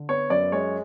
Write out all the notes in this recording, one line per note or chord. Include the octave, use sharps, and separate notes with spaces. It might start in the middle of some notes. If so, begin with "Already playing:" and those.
Already playing: D3
B3 C#5
F#2 D5
G#3 C#5